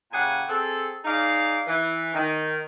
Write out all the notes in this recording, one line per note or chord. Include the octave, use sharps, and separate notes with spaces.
A#2 C#3 G4 F#5 G#5
C4 G#4 A4
D#4 G#4 D5 F5
E3
D#3